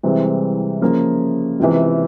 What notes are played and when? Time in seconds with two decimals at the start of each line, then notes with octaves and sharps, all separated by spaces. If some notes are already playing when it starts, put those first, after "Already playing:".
0.03 C2 C3 E3 G#3 C4
0.81 C#3 F3 A#3
1.60 C#2 C3 E3